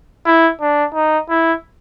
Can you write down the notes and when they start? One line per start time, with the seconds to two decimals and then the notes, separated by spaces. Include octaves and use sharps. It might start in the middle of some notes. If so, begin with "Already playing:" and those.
0.26 E4
0.61 D4
0.94 D#4
1.29 E4